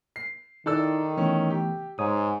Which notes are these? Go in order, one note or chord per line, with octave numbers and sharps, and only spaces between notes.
C7
D#3 D#4 E4 A4 D5 E6
E3 A3 B3 C#4
G4
G#2 C#5 D#6